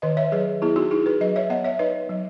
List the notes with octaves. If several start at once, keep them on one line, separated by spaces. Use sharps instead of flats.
D#3 B4 D#5
C#5 E5
F#3 G#4 B4
B3 E4 G#4
D#4 F#4
D#4 E4 G#4
G#4 B4
F#3 B4 D#5
C#5 E5
B3 D#5 F#5
C#5 E5
D#4 B4 D#5
F#3